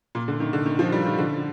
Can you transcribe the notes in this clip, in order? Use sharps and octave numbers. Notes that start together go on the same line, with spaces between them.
A#2
D3
D#3
D3
D#3
F3
G3
D#3
D3